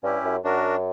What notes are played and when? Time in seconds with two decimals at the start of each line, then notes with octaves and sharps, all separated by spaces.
0.03 G2 C#4 E4 G4
0.24 F#2
0.44 F#2 D4 F#4 A#4